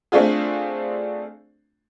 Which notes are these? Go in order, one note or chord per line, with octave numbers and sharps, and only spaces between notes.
A3 C4 D4 F4 G#4